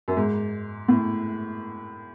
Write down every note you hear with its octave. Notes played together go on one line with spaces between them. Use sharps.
F#2
G#2
A2